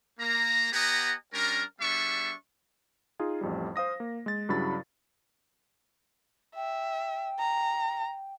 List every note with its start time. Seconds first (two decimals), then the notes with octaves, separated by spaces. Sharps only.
0.20 A#3 A#5
0.73 B3 G4 D#5 F#5 G#5 A#5
1.34 G3 C#4 D4 A#4
1.81 G3 B3 D4 G#4 E5 C#6
3.19 D#4 F4 G#4
3.41 A1 F2 G3
3.76 C5 F5 D#6 A#6
4.00 A#3
4.26 G#3 A6
4.49 G2 C#3 F#3 E4 B5 A6
6.55 E5 G5
7.39 A#5